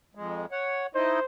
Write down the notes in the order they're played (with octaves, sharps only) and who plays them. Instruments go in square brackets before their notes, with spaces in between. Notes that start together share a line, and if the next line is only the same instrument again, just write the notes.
[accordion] F2 G#3
C#5 F#5
[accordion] D#4 E4 D#5 [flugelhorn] C5